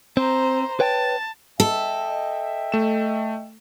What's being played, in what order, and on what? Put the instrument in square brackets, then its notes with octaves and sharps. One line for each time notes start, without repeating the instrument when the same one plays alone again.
[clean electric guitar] C4 [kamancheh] C5 A#5
[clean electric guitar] B4 C#5 G5 [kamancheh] A5
[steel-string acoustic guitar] A4 [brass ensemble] D#5 E5 G5
[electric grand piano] A3 E7